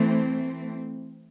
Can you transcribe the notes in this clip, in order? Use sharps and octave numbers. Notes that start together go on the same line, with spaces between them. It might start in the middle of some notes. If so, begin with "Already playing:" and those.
Already playing: E3 A3 C4